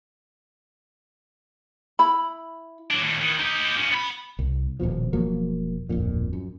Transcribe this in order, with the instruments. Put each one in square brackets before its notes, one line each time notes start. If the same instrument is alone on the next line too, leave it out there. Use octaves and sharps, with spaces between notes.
[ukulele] E4 B5
[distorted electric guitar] F#3 D4
A2 D#3
D#3 E3
D#4 G4
F3 C#4
B3 B5
[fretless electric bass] C2
D#1 C#2 B2 F3
E1 F3 F#3 A#3
D1 G1 F2 A#2
F#2